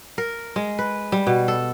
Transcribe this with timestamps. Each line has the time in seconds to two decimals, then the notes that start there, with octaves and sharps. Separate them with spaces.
0.18 A#4
0.56 G#3
0.79 B4
1.12 G3
1.27 B2
1.48 A4